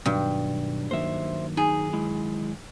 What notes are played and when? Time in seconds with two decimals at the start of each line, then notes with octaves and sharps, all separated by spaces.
0.06 G2 B2 D#3 F#3
0.91 D#3 F#3 A#3 C5 E5
1.57 D#4 G#4
1.93 G#3 E4